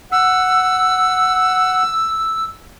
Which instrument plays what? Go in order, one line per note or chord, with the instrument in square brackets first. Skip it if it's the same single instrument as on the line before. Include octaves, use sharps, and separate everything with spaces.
[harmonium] F#5 [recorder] E6